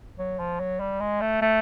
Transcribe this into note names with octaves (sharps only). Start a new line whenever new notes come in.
F#3
F3
F#3
G3
G#3
A3
A3